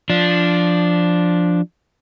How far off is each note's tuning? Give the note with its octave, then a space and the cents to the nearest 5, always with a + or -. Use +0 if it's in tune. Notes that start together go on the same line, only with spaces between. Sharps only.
F3 +0 D4 +0